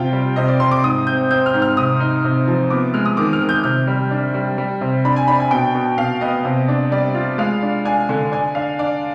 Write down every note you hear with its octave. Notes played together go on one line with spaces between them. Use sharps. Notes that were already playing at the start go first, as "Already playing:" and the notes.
Already playing: C3 F4 G5
G3
C3 D#5
D5
C3 C6
D6
G#2 D#6
C4 G6
C4 G6
F6
G#2
F6
C3 D#6
D#4
C3
F3
B3 D6
G#3 F6
D#6
D#3 D6
F6
D#3
G6
C3 F6
G3
D4
G3
G3
C3
D4 B5
G#5
D4 B5
G#5
B2 G5
B2
B2 F5
B3 D#5
C3
D4
G3 D5
F4
G#3 F5
D4
D4 G#5
D3
D4 G#5
D4 F5
D4 D5